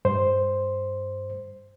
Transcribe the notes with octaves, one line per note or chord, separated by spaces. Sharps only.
G2 C5